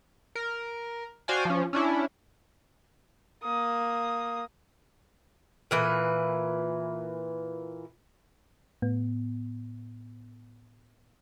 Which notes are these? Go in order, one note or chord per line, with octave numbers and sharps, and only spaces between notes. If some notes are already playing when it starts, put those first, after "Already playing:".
A#4
F#4 C5 D5 F5 G5 G#5
F3 C#4
C#4 D4 E4
A#3 D#6
A#2 E3 B4
A2 B3